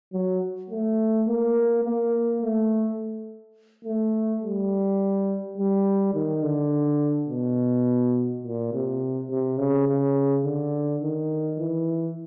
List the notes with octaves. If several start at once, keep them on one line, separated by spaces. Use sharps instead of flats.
F#3
A3
A#3
A#3
A3
A3
G3
G3
D#3
D3
B2
A#2
C3
C3
C#3
C#3
D3
D#3
E3